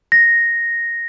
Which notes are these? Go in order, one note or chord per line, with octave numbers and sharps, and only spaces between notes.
A#6